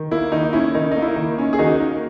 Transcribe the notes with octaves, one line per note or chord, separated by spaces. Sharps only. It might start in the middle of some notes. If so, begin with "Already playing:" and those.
Already playing: D#3
A#3 E4
D#3 D#4
C#4 E4
D#3 D#4
A#3 D#4
E4
D#3
C#4
G#4
D#3 D#4 F#4
A#3